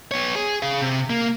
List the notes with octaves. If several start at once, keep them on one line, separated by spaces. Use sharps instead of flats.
B3 C#5
G#4
G#4 F5
C3
A#3